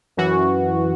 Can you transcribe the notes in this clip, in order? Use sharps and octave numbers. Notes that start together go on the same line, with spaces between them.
F#2 E3 F#4